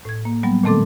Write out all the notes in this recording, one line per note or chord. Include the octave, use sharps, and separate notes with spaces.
A2 G#6
A#3
F#3 G3 B3
A#2 D#3 A3 C4 A4 D6